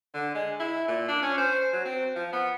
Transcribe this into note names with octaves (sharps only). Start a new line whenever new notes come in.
D3
G#3
E4
A#2
D4
C#4
C5
F#3
C4
F3
B3